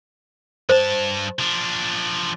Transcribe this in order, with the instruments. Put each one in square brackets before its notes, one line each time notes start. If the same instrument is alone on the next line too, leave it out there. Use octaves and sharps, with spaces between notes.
[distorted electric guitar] G2 A5 [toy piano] C5
[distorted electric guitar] F3 D4